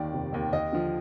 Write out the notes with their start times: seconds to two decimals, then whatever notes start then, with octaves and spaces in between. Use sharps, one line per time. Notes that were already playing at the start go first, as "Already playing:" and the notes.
Already playing: D#2 D#3 D5
0.13 F1
0.33 D#2 D#3
0.53 D#2 D#5
0.72 D3 F3